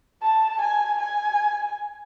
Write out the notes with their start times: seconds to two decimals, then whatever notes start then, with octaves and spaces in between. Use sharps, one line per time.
0.22 A5
0.61 G#5
1.00 G#5